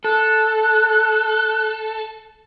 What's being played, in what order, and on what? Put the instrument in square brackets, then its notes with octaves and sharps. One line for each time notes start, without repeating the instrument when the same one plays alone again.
[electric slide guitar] A4 [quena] F#6